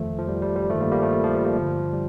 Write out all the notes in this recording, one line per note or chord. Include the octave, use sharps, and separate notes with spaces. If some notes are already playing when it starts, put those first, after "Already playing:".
Already playing: F2 D#3 F3 A3
F3
G3
G3
G3
G2 D#3 F3 A3
G3 A#3
G3 A#3
F3 A3
G3
F3
G3
G3 A#3
G2 D3 F3
G3